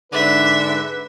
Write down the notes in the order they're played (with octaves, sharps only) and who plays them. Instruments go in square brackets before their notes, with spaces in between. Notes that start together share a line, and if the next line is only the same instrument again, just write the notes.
[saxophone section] G#2 D3 D4 [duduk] B4 [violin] E5